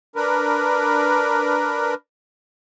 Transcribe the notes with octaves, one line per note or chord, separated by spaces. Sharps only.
D4 A#4 B4